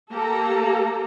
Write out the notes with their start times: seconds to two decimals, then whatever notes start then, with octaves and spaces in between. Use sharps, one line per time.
0.11 A#3 G4 A4 A#5